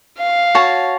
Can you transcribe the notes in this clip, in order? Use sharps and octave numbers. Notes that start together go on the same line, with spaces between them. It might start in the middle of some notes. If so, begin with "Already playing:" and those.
F5
F#4 C#5 A5